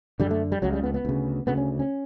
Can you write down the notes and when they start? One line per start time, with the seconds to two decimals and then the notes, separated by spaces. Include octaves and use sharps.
0.20 F#2 D3 G3
0.31 A3
0.52 G3
0.62 C#2 C#3 F#3
0.73 G3
0.84 B3
0.94 B3
1.05 D2 C#3
1.47 D2 C#3 B3
1.57 C#4
1.79 C#4